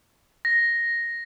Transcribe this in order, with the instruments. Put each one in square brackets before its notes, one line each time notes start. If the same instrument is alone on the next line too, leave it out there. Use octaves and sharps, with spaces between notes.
[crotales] A#6